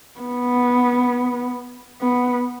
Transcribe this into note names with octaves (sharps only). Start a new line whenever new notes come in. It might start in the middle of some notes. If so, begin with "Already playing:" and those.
B3
B3